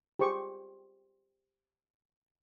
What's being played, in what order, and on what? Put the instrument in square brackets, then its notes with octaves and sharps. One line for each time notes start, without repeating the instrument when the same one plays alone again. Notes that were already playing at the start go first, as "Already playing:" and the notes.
[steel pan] G4 G#4 C5 C#6 D6